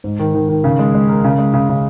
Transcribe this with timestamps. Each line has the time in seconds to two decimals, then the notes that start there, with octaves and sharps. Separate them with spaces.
0.04 G#2
0.19 D#3
0.34 D#3
0.49 D#3
0.64 C#3
0.79 G#3
0.94 G#3
1.09 A#4
1.24 C#3
1.38 G#3
1.54 C#3
1.69 C#3